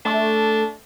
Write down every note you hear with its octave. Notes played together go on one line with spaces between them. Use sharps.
A3 D4